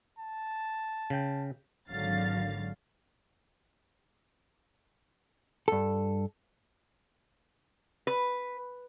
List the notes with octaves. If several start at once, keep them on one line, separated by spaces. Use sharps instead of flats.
A5
C#3 G5
G#1 D3 F#3 F5 A6
G2 A4
B4